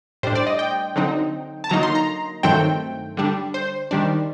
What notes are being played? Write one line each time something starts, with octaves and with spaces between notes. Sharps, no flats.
A2 G3 D4 C5
D5
D#5
G5
D3 F#3 C4 D#4
A5
D3 F#3 A#3 D#4 A#5
C6
A#5
G2 D#3 F#3 A3 C4 G5
D3 G3 D4
C5
D#3 G3 D4